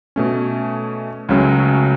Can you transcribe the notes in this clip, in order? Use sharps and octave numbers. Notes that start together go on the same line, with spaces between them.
B2 A3 C#4
C#2 C#3 F#3 A3 C#4